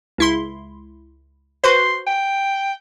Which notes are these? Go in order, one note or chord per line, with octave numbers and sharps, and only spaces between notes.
C#2 E4 C6
F#4 B4 C5 C6
G5